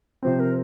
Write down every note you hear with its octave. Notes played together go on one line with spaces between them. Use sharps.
C3 F3 C4 C5
A#4